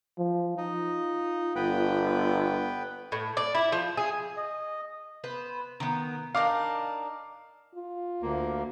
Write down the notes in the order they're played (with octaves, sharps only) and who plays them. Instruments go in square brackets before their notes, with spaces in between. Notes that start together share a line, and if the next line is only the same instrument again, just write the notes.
[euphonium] F3
[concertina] D#4 [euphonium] F4
[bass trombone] G1 [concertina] B3 B4 G5
[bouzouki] A2
D5
E4
F3
G#4
[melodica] D#5
[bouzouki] B3 B4 C5
D#3 B3
[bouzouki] D4 D#4 A#4 [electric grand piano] F5 D6
[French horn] F4
[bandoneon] D2 A#3